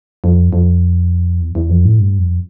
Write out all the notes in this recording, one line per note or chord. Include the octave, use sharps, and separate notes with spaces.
F2
F2
E2
E2
F2
A2
G2
F2